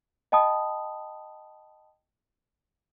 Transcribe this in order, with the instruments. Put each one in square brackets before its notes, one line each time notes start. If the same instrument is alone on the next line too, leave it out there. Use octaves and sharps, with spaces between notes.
[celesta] D#5 G5 A5 B5 D#6